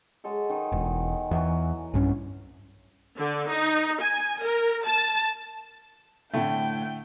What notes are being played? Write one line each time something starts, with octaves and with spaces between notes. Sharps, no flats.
F#3 G#3 A4
D#3
E1
E2 E3 F#3
B1 G2 C#4
D3
D#4
G#5
A#4
A5
A2 D3 A3 E4 G5